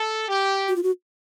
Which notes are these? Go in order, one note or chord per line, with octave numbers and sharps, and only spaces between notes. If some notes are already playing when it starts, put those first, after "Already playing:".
Already playing: A4
G4
F#4
F4
F#4